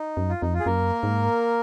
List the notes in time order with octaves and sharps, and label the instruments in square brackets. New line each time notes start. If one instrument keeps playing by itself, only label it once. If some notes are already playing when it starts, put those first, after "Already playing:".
Already playing: [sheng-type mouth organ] D#4
[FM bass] F#2
[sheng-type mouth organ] F4
[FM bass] F2 [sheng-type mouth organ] D#4
[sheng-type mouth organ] F4
G#4
[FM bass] F#2 [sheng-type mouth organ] A#3 A#4
[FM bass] G#2